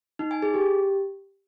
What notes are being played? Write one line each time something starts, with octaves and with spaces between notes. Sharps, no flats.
D#4
G#5
G#4
G4